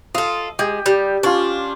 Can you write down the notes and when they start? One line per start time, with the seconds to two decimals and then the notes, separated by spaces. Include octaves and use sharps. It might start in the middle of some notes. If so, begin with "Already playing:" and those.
0.15 F4 A4 D#5
0.59 G#3 G4
0.86 G3
1.23 C#4 D4 F4